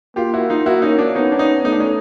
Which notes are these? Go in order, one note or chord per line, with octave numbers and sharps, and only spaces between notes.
A#3 F4 G4
E4 F#4
D#4 F4
A#3 E4 F#4
C#4 D#4
D4
B3 C#4 D#4
D4
C#4 D#4
A3 D#4
D4
C#4 D#4